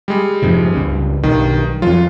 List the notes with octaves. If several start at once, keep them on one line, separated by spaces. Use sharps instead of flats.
G3 G#3
F2 G#2 C3
C#2 G2
B1 G2 D#3
F2 F#3 F4